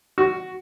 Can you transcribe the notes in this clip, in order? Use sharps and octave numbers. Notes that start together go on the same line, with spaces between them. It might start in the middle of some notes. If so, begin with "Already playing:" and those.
F#4